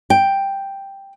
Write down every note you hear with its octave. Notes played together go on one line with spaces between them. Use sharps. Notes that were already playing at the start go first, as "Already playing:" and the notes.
G5